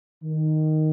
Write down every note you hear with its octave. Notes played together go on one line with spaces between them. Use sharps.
D#3